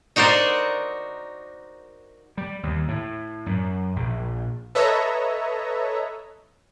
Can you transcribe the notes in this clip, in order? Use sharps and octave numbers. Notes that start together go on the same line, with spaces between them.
D#4 F#4 A#4 C5 D5
G3
D#2
A2
F#2
A#1
A4 B4 C#5 D#5 E5 A#5